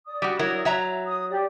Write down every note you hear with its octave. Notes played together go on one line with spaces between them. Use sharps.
D5 D#6
G3 F#4
F#3 E4 A#4
F#3 E5 A#5
D#6
G4 D5